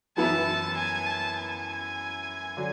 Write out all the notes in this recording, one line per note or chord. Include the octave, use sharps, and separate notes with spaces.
F#2 E3 B3 E4 A5
G#5
A5
G#5
D3 F#3